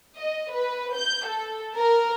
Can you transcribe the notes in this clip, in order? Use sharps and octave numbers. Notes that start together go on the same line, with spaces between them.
D#5
B4
G6
A4
A#4